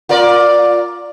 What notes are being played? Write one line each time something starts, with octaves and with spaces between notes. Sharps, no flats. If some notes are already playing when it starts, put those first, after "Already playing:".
F4 A#4 D5